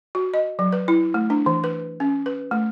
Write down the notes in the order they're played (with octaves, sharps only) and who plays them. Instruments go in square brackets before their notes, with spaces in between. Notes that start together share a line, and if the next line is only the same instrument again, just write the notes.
[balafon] F#4
D#5
F#3
B4
E4
A3
D4
E3
B4
C#4
B4
A3